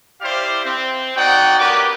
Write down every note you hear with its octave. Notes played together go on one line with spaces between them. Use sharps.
E4 G4 C5 D5 F5
C4
D#4 F#4 D5 F#5 G5
A#3 C#4 G4 B4 D6